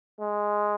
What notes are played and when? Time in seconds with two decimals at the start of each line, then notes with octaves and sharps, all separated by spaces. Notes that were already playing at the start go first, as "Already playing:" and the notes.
0.21 G#3